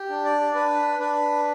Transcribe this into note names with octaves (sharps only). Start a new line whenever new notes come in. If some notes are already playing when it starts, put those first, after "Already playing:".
Already playing: G4
D4
D5
D4 B4
D4 B4